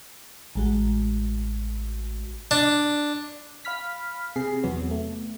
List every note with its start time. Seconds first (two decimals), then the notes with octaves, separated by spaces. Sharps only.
0.55 A1 G#3 F#4
2.51 D4
3.65 F5 B5 F6 B6
4.36 C3 G#4 C7
4.63 E2 C3 F#3 B3
4.91 A3